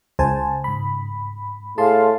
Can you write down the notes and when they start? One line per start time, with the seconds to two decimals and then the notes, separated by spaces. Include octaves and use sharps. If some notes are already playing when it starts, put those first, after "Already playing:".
0.19 C#2 C5 G#5 A5
0.64 G#2 B5
1.78 A2 G#4 F5 A5 C6